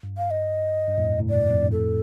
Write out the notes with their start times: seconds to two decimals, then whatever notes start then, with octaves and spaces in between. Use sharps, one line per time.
0.03 G2
0.18 F5
0.31 D#5
0.88 G2
0.98 F2 A2
1.19 A2 C3
1.29 G2 A#2 D5
1.51 F2 A2
1.62 G2
1.71 F2 A2 A4